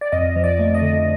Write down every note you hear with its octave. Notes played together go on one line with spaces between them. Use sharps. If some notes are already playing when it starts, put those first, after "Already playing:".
D5
F2 D#5
F3
D5
A3
D#5
D3